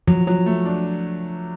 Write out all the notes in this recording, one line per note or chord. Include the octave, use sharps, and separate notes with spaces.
F3 F#3
F#3
A3
D4